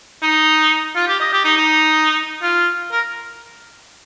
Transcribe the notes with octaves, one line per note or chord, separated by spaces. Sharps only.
D#4
F4
G4
D#5
G4
D#4
D#4
F4
A#4